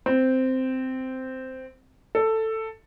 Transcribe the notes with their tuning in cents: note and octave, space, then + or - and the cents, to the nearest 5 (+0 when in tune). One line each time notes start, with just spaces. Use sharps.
C4 -10
A4 +10